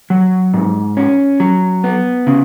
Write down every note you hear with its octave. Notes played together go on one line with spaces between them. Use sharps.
F#3
G#2
C#4
F#3
B3
C#3